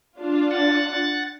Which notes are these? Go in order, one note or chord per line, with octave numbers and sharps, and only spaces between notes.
D4 F4
F#5 A6